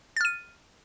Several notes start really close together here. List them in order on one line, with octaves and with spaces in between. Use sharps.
A6 F6 D#7